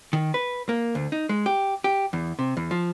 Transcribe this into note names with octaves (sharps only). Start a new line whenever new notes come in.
D#3
B4
A#3
D2
D#4
G#3
G4
G4
E2
C3
E2
F3